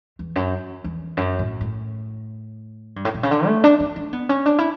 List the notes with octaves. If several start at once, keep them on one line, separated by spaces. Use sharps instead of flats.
E2
F#2
E2
F#2
A2
A2
G2
A2
B2
C#3
D3
A3
D4
D4
D4
B3
C#4
D4
E4